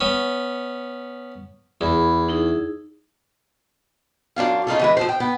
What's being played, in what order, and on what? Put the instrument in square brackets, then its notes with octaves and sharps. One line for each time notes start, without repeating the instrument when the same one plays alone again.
[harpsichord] B3 C#4
[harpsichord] E2 [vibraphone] E4 G#4 B5
[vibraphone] D#4 E4 G#4
[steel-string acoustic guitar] F#2 D4 F4 F5
C#3 D#4 F4 A4
E3 G#3 B4
F3 A4 C5
G5
B3